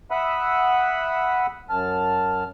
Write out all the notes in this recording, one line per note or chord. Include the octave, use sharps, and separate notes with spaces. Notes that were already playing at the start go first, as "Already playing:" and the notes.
E5 F#5 B5 D#6 E6 F#6
F#2 A5 F6